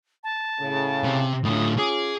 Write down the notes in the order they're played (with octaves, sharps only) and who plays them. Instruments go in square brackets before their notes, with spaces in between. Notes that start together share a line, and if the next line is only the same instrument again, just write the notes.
[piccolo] A5
[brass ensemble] A2 C#3
[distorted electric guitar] C3
[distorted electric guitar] A2 D3 [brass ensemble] C#4 F4 [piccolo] D#6
[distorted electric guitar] G#4 [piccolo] D6